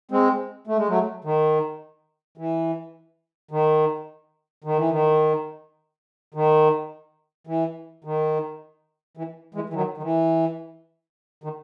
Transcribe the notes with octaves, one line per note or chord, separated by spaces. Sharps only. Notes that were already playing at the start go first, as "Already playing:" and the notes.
G#3 C4
A3
G#3
F#3 A3
D#3
E3
D#3
D#3
E3
D#3
D#3
E3
D#3
E3
E3 G#3
E3
D#3 F#3
D#3
E3
D#3